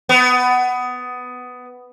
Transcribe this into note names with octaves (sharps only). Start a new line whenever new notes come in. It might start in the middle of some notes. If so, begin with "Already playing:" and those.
B3